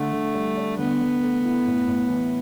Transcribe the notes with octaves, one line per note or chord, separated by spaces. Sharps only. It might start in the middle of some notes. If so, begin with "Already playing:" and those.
Already playing: D3 A3
D3
G3
D4
D3 B3
D3
A3
E4
A2
A2
E3